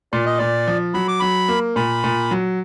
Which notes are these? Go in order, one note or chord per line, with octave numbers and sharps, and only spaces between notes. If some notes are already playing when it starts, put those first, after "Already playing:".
A#2 D5
D#5
A#2 D5
F3
F#3 B5
D6
F#3 B5
A#3
A#2 B5
A#2
F#3